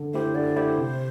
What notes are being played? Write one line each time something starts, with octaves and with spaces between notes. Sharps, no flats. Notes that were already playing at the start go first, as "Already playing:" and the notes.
Already playing: D3
A3 E4 G4 C5
D3 D5
A3 E4 G4 C5
C3